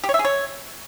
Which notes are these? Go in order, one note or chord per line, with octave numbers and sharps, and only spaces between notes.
G4
C#5
E5
G#4
C#5